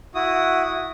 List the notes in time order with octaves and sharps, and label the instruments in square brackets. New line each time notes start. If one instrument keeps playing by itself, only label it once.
[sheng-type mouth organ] E4 F#4 D#6